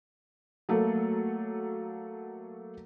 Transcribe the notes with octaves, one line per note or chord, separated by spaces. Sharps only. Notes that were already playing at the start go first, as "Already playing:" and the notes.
F#3 A3 A#3 A4